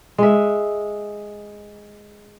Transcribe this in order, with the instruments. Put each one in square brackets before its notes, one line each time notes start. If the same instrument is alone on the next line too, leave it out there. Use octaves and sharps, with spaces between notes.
[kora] G#3 E5